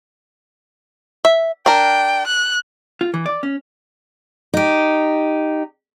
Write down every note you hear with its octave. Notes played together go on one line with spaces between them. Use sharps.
E5
D4 A#4 G5
F#6
F4
E3
D5
C#4
D#4 G4